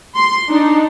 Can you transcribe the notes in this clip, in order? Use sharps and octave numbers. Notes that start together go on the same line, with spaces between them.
C6
D4 D#4